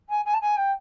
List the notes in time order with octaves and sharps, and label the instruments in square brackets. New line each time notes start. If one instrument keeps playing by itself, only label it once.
[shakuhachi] G#5
G#5
A5
G#5
G5